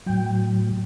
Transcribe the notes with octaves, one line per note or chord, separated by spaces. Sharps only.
A2 F#3 G5